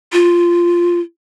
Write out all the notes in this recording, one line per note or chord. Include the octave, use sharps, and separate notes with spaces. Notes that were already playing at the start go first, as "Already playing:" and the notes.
F4